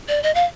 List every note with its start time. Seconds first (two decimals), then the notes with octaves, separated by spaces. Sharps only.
0.08 D5
0.23 D#5
0.35 F5